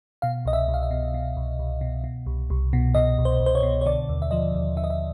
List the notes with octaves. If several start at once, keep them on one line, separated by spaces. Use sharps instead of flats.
B2 F5
C2 D#5
E5
C2
F5
E5
B2
B2
C2
C2
B2
B2
C2
C2
B2
B2 D#5
C2
C5
C2
C5
C#5
B2
C#5
D3 D5
D#2
E5
F3 D#5
D#2
D3 E5
D#5
E5